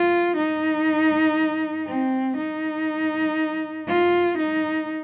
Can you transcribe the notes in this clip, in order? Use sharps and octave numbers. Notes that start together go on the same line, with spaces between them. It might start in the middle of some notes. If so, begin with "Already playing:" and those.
Already playing: F4
D#4
C4
D#4
F4
D#4